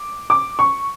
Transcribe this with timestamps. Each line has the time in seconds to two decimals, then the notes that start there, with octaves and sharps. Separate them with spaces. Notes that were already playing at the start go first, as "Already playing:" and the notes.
Already playing: D6
0.30 D6
0.59 C#6